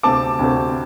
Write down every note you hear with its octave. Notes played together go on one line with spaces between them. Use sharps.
D2 C3 A3 C4 A5 D6
D2 C3 A3 C4